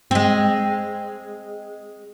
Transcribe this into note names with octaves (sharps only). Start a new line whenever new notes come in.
G#3 C4